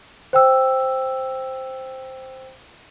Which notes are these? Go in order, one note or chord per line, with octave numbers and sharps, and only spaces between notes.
C5 G5 E6